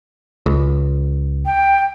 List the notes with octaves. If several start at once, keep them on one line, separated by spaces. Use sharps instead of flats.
C#2
G5